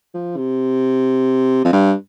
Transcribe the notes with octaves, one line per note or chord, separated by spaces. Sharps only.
F3
C3
F2
G2